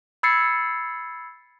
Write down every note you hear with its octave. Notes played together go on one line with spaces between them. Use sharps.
B5 E6 G#6 A6 C7 C#7